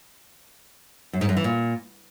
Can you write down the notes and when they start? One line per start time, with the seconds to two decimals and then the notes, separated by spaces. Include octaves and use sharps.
1.13 F#2
1.21 G#2
1.29 F#2
1.37 E3
1.44 A#2